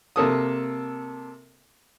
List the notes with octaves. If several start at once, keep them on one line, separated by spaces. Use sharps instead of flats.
C3 A#3 A4 D#6